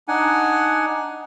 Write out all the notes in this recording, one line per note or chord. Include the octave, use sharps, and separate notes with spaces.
D4 D#4 F#5 G#5